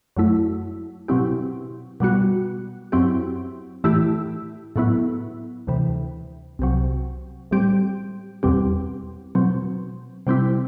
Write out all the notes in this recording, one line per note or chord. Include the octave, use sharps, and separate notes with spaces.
F#2 F#3 A3 E4
B2 F#3 C4 E4 G4
B2 G3 B3 F#4
F#2 F#3 C4 E4 G4
A2 E3 A3 E4 G4
A2 F#3 B3 E4
D2 C3 E3
C2 C3 F#3
A2 G3 C4 G4
E2 B2 G3 C4 G4
B2 F#3 C4
C3 G3 C4 E4